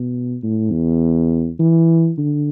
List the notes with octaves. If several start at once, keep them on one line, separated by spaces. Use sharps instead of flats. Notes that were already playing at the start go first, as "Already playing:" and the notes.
Already playing: B2
A2
E2
E3
D3